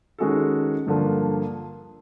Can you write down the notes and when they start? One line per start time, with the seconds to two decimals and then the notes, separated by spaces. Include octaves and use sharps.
0.19 D#3 G#3 C#4 F#4 A4
0.87 G2 D3 F3 A#3